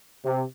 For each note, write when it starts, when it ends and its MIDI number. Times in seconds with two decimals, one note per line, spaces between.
0.25 0.43 48